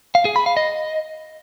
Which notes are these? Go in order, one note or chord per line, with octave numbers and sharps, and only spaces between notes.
F5
G#4
B5
F5
D#5